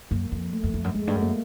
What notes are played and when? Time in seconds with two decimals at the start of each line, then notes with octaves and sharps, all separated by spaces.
0.11 F#2 A#3
0.32 F2
0.53 A3
0.64 F2
0.74 F2
0.84 F#2
0.95 F2 G#3
1.07 G2 A3
1.15 F#2
1.22 A#3